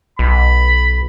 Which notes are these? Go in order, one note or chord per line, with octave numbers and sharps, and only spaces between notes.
B1 B5